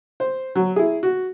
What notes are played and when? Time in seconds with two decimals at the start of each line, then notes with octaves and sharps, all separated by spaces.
0.20 C5
0.55 F#3
0.76 E4 G#4
1.03 F#4